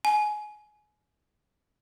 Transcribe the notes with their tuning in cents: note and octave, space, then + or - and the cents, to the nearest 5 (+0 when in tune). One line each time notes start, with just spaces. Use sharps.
G#5 +25